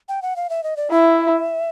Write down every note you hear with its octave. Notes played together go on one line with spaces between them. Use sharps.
G5
F#5
F5
E5
D#5
D5
E4 E5